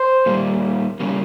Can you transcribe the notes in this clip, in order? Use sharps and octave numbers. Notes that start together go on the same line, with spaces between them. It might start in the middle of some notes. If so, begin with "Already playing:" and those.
Already playing: C5
A#2 G3 A#3
C#3 G3 A#3